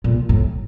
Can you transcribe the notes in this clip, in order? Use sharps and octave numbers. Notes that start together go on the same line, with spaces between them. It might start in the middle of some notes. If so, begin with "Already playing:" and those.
A#2
A2